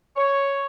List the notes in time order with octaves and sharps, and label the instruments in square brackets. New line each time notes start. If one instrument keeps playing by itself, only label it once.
[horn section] C#5